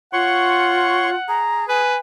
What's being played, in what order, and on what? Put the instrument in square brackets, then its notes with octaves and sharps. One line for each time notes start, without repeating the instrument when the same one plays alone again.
[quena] F4 [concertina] C#5 C6 C#6 [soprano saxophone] F#5
[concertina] G#4 [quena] A#5
[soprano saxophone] B4 [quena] G#5